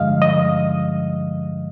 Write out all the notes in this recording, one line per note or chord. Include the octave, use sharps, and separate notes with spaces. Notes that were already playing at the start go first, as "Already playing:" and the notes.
Already playing: G2 D3 F3 G#3 D#5 F5
D#5